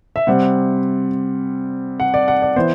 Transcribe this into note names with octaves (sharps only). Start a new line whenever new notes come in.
E5
C3 G3 C4 F#5
F#5
D5
F#5
D5
E3 B3 C5